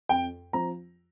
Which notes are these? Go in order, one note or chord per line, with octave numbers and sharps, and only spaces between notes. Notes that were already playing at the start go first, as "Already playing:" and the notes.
F2 G5
F3 C4 A#5